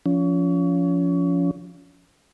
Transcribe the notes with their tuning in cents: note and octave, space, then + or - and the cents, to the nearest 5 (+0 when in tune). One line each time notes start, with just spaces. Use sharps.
F3 +0 C#4 +30